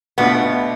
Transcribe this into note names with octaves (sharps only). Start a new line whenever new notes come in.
B2 A3 B3 D4 F4